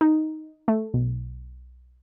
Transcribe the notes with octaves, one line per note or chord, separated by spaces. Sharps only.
D#4
A3
B1